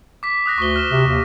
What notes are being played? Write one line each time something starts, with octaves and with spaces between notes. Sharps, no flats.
D6 B6
D#6 F#6 A#6
D2 C#6 G7
F6 E7
C3
D#2